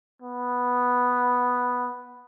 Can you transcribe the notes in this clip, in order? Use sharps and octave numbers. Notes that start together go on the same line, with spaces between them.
B3